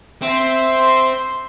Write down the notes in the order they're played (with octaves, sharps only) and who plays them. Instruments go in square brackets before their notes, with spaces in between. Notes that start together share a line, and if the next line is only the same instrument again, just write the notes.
[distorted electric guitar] C4 [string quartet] E5 C6